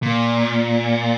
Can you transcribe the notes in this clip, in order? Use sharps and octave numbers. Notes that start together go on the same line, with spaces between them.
A#2